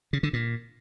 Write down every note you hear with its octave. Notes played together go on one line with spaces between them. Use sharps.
C#3
D3
A#2